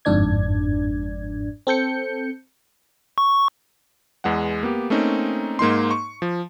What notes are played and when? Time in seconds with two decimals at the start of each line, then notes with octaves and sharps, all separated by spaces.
0.05 G1 F2 G#2 D4 D5 G#6
1.67 C4 A4 G6 C#7
3.18 C#6
4.24 E2 G#3 B3 F#5
4.63 A#3 B3 G4
4.90 A3 A#3 C4 C#4 D#4
5.59 G#2 A#3 D#4 C6
5.91 C#6
6.22 F3